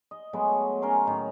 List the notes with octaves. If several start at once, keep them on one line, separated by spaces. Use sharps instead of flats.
D#5
F#3 G#3 A3 B3
C#4 A#4 A#5 C6
A2 D#3 C#4